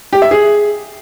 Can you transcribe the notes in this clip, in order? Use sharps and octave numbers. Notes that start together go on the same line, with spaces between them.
G4
E5
G#4